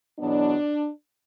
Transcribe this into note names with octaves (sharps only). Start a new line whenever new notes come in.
E2 B2 F#3 B3 D4